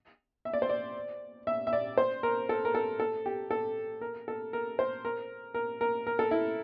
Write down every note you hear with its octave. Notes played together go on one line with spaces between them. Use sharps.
E5
D5
C5
D5
E5
E5
D5
C5
A#4
A4
A#4
A4
A4
G4
A4
A#4
A4
A#4
C5
A#4
A#4
A#4
A#4
A4
E4